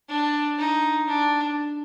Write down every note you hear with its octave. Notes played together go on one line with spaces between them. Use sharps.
D4
D#4
D4